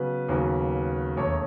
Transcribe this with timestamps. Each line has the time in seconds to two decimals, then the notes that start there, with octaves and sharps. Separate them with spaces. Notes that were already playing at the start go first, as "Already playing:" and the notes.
Already playing: C#3 F#3 B3 B4
0.28 D#2 C#3 F#3 B3
1.17 E1 D#2 D#3 A3 C#5